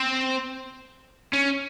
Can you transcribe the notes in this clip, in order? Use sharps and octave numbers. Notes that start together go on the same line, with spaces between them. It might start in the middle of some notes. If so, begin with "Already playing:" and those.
Already playing: C4
C#4